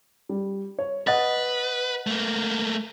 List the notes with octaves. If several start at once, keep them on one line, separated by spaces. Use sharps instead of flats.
G3
C#5
B4 D#5 F#5 A6
A3 A#3